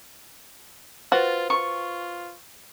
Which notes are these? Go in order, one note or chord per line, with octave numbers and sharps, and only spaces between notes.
F4 F#4 B4 C5 A6
F4 C#6